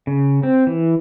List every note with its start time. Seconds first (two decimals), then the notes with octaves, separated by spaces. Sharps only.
0.07 C#3
0.43 C4
0.67 E3